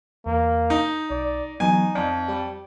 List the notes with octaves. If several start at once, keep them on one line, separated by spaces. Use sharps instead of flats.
E2 A#3
D#4 G6
B1 D5
E3 F#3 B3 D#4 G#5
F2 D5
G3 G4 D5